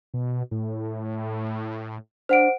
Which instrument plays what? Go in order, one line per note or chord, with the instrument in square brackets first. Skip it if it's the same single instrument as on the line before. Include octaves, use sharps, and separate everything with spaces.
[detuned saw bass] B2
A2
[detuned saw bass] D4 [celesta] C5 F#5 D7